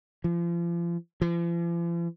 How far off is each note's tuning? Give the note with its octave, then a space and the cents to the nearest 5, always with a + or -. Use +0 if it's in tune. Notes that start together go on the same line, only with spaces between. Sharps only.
F3 -35
F3 -45